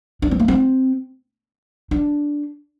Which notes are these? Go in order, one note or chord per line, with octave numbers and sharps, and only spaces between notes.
D4
C4
A#3
C4
D4